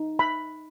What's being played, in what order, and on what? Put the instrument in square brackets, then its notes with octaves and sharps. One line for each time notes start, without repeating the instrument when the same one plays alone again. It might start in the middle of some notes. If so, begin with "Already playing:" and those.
Already playing: [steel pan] D#4
B5